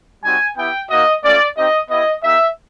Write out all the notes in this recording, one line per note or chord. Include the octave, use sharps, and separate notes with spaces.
G3 C4 D#4 F#4 G#5
B3 E4 G4 G5
A#3 D#4 F#4 D#5
A3 C#4 F4 D5
C4 D#4 G4 D#5
B3 E4 G4 D#5
A#3 D#4 G4 E5